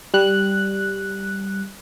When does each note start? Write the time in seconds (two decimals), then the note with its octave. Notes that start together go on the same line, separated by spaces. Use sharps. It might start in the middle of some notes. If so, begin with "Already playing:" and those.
0.14 G3 F#6